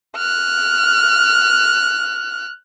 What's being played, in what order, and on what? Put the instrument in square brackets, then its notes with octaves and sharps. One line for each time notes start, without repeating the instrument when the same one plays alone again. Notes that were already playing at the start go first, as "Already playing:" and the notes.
[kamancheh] F6 F#6